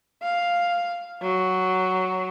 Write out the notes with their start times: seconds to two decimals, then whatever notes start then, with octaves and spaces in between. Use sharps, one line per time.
0.22 F5
1.22 F#3